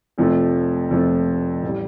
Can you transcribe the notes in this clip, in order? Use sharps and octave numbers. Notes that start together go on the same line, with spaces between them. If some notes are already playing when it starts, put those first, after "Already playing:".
F1 F2 F3 A3
F1 F2 F3 A3
A1 G3